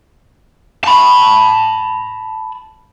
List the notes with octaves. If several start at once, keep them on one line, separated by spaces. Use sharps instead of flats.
A5 B5